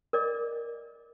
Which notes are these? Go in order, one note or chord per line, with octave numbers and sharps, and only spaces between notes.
A#4 D5 D#5 D6